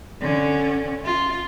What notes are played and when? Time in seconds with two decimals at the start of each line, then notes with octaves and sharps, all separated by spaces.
0.21 D3 C#4
1.05 F4